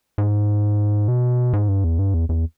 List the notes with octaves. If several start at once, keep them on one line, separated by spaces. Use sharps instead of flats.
G#2
B2
G#2
G2
E2
G2
E2
E2